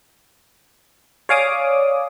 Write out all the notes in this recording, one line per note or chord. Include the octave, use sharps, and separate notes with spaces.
C#5 D5 F5 G#5 D6 D#6